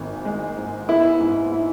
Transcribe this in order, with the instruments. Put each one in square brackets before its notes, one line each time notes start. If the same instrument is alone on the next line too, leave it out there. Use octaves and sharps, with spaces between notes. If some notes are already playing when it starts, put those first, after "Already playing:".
Already playing: [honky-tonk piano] G#1 E3
G#3
G#2
[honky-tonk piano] B3 [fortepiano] E4
[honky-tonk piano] G#2
E4